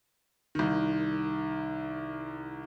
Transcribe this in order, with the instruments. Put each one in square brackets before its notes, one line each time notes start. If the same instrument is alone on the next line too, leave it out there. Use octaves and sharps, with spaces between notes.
[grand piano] C2 D#3